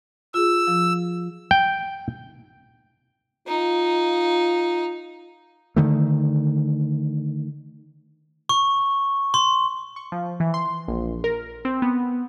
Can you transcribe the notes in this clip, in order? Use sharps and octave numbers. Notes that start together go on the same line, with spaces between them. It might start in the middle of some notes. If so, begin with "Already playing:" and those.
F4 G#4 E6
F3
G5
D#4 F4
D3 D#3 A3
C#6
C6
C#6
F3
E3
C6
A#1
A#4
C4
B3